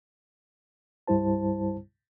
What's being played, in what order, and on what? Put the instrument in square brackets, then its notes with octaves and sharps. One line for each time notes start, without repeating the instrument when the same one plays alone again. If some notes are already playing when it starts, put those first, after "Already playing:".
[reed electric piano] C2 G2 G3 E4 C5 A5